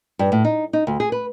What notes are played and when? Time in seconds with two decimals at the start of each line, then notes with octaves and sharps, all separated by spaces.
0.19 G2
0.32 A2
0.45 D#4
0.73 D#4
0.87 D2
1.00 G#4
1.12 B4